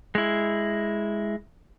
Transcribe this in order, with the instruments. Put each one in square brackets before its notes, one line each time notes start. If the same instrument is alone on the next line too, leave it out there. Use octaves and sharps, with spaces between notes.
[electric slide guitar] G#3 E4